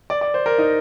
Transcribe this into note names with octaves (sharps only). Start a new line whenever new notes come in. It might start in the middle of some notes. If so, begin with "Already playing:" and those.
D5
D5
C5
A#4
D#4